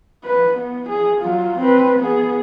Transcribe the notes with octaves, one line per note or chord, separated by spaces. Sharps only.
B4
B3
G#4
F#3 F4
C4 B4
B3 G#4